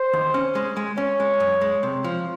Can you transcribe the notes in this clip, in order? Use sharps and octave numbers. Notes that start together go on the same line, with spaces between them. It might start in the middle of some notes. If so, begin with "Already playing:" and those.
Already playing: C5
D#2
C#4
G#3
G#3
C#4 C#5
G#3
F#2
G#3
C3
F3